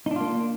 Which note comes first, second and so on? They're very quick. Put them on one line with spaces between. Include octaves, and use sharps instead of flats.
D#4 D4 F4 A#3